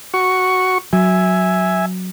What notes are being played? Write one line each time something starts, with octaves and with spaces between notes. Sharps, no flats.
F#4 C#6
F#3 E5 G#5